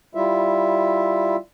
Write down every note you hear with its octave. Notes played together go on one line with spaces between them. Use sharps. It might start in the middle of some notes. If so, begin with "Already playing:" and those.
G3 E4 F4 E5